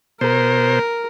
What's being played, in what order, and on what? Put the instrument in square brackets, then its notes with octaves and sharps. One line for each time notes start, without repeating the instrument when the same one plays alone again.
[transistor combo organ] B2 C5 [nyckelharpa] A#4